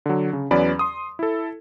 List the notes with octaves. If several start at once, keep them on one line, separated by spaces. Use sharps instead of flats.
D3 F#3
C#3
E2 F#3 C#4 B4 D5 B5
C6 D#6
E4 A4